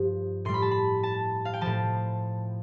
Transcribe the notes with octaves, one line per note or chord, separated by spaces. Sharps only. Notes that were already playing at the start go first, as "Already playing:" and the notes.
Already playing: G2 F3
A2 G3 C6
B5
A5
B5
A5
F5
G5
A2 F3 A5